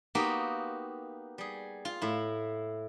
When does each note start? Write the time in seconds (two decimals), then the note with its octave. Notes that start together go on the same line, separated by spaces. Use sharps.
0.15 A#3 B3 D#4 F#4 G4
1.38 G3 G#4
1.85 F4
2.02 A2 E4